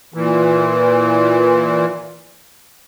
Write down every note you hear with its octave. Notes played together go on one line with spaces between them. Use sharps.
A#2 E3